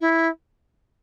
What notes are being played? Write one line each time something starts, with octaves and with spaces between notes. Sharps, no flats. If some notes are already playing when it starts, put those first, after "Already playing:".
E4